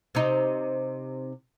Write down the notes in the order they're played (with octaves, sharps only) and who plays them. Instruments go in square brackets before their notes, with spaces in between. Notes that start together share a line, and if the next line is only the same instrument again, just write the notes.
[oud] C3 D#4